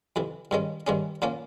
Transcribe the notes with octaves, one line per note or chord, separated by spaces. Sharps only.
F2 C3 E3
G2 D#3 G#3 C#4
G2 D#3 G#3 C#4
A#2 F3 A#3 C#4